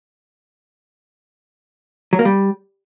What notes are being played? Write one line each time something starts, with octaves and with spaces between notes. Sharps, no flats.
F#3
A#3
G3